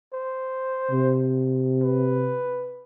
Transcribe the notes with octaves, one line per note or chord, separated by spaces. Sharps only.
C5
C3
B4